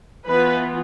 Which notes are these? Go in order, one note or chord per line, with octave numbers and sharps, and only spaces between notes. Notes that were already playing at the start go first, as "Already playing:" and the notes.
E3 B3 F4 B4